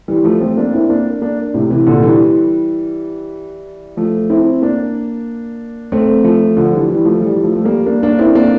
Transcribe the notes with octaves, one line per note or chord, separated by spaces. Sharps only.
E3 G3
F3 A3
A3 C4
A#3 D4
C4 E4
A#3 D4
A#3 D4
A2 C3
C3 E3
A#2 D3
E3 G3
F3 A3
C4 E4
A#3 D4
A3 C4
F3 A3
D3 F3
E3 G3
E3 G3
F3 A3
E3 G3
F3 A3
A3
G3 A#3
A#3 D4
A#3 D4
C4 E4
A#3 D4